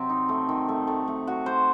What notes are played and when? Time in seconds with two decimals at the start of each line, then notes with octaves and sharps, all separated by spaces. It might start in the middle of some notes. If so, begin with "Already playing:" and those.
Already playing: C3 F#3 C4
0.09 D#4
0.29 A3
0.49 D#3
0.68 A3
0.87 A3
1.08 A3
1.27 F#4
1.46 C5